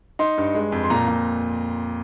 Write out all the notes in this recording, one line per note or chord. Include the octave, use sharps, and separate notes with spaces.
D#4 C6
G2
G#3
F2
C6
A#2 A#5
A#2